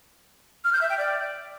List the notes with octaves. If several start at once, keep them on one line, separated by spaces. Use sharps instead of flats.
F6
G6
E5
G5
D5